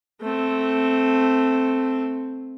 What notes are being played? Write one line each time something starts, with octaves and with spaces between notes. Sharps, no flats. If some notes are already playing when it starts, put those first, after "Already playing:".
A3 C4